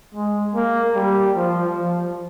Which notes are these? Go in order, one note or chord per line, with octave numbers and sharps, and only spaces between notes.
G#3
A#3
G3
F3
F3